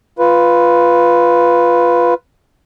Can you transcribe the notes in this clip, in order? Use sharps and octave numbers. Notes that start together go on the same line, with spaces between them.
F4 B4